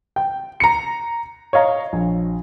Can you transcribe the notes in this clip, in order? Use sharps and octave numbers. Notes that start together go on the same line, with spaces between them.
G5
A#5 C#7
C#5 D#5 F5 A#5
A#1